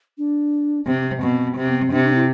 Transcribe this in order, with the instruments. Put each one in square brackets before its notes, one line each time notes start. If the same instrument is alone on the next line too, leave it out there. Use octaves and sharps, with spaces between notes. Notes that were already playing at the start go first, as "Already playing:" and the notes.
[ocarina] D4
[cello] C3 [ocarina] C4
[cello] B2
[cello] C3 [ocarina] C4
[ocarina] B3
C4
[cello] C3 [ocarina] D4
[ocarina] D4
E4